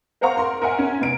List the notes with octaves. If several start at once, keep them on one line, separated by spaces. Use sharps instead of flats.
A#4 C5 F5 F#5 A#5 C#6
A#4 C6
A#4 E5 F#5 G#5
C#4
F1 D7